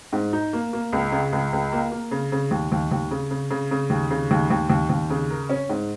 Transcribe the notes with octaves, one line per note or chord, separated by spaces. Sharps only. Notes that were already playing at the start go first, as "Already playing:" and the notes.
G#2
D#4
A#3
A#3
C#2
C#3
C#2
C#2
A#3
A#3
C#3
C#3
D#2
D#2
D#2
C#3
C#3
C#3
C#3
D#2
C#3
D#2
D#2
D#2
D#2
C#3
A#4
C#4
G#2